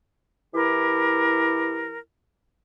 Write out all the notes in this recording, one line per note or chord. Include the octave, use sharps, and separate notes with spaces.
E3 E4 G4 A#4